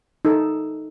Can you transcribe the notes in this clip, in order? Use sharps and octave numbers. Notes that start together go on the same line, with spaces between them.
D#4 A4